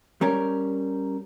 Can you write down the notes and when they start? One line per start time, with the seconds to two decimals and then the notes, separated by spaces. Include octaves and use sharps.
0.21 G3 C#4 A#4